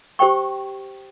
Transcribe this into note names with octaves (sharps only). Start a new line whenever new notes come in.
G4 C5 G5 C#6